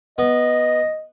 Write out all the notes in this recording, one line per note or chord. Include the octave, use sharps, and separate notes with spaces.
B3 D#5